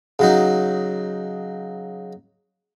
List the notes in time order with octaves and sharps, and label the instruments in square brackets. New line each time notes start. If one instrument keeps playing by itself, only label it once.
[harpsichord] C#3 F#3 D#4